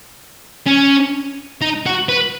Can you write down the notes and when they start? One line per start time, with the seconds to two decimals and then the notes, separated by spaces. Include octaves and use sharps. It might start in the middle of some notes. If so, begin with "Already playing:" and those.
0.66 C#4
1.61 D#4
1.86 F#4
2.09 B4